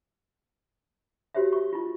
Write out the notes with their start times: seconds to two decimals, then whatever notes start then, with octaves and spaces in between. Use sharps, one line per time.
1.34 F#4 G4 C5 C#5 E5
1.53 C#6
1.73 E4 F4